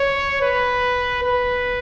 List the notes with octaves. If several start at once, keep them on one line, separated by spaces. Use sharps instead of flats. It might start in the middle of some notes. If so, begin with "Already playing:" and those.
Already playing: C#5
B4
B4